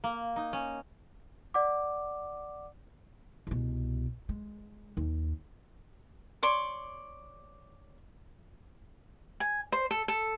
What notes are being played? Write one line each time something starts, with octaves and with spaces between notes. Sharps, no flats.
A#3
D#4
C#4
D5 F#5 D6
C2 B2
G#3
D#2
C#5 D5 C6 D6
G#5
C5
A4
A4